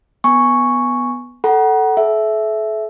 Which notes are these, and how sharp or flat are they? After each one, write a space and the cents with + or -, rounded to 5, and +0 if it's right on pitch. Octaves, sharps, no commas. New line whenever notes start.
B3 +0 G#5 +0 C#6 +0
A4 +0 F#5 +25 A#5 +45
A4 -40 E5 +0